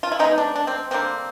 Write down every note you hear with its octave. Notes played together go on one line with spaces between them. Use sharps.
F4
E4
C3 E3 G#3 B3 D#4
D4
D4
C4
D3 G3 A#3 C4